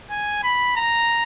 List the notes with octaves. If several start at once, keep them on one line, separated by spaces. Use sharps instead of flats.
G#5
B5
A#5